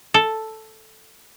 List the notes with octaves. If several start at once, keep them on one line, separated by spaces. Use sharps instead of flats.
A4